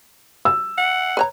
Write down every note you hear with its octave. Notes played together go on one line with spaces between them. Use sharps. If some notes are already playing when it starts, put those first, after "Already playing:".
E6
F#5
B4 C#5 A#5